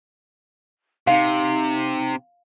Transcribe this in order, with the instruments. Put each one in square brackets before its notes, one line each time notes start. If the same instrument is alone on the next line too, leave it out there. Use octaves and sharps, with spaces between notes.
[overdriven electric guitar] C3 [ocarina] D#4 [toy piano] F5